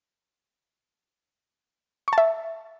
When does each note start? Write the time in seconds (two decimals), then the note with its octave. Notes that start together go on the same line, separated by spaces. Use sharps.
2.08 C#6
2.13 A5
2.18 E5